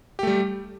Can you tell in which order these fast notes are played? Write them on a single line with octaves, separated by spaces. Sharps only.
G4 A3 G3